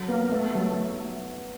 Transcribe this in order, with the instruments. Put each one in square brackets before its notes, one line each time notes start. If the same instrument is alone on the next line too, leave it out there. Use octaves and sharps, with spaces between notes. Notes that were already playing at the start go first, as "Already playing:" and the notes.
Already playing: [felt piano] F#3
[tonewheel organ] A#3 [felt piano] B3
[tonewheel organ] A3 [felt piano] B3
[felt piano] F#3